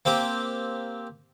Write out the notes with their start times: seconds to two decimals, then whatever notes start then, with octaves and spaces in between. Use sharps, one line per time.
0.05 A#3 C4 G4